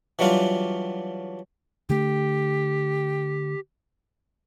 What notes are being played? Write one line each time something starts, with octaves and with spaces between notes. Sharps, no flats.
E3 F#3 G3 D4 F4
D3 A3 G4